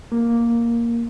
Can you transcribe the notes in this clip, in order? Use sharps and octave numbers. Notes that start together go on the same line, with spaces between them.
A#3